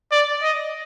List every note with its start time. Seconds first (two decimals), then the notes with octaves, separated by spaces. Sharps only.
0.12 D5
0.42 D#5